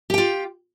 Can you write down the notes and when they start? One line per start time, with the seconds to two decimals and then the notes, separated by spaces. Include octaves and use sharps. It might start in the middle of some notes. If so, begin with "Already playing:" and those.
0.10 G4
0.14 G5
0.18 F4